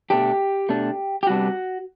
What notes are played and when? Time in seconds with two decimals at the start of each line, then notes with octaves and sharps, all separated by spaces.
0.10 B2 A3 D4 G4
0.69 B2 A3 D4
1.23 G4
1.27 C3 G3 B3 D4 F#4